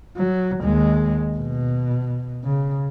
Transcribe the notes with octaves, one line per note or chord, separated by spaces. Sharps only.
F#3
D#2 G#3
B2
C#3